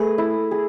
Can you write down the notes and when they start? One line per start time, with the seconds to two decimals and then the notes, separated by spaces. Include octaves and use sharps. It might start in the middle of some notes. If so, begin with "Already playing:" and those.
Already playing: A3 G#4 B4
0.18 E4
0.51 G#4